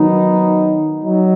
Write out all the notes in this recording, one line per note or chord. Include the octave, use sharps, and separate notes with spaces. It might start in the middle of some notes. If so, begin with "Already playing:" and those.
Already playing: D#3 F#3 B3 D#4
F#3 D#4